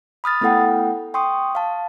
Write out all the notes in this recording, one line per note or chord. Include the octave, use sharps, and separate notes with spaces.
B5 D#6 F6 A6
A3 B3 E4 A4 F#5 G5
G5 C6 C#6 D#6
F5 A5